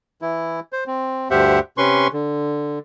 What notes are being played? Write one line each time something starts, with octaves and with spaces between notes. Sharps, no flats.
E3 E4
C5
C4
D2 G2 G4 C5 E5 F#5
C3 C#4 B4 C6 C#6
D3